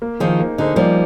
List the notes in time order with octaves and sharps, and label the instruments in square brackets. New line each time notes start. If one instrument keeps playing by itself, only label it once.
[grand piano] A#3
[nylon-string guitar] D#3 F3 [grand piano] D#4 G#4 C5
[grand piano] A#3
[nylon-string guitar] D3 [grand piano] D#4 G#4 C5
[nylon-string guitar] F3 G3 [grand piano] A#3